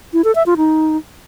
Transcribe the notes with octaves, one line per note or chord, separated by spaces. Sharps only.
E4
A4
E5
F4
D#4